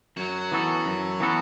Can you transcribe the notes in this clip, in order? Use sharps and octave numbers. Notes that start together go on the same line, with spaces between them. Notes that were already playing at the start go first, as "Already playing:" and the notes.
F#2 F#3
E3 B3 F#4 A4
F#2
E3 B3 F#4 A4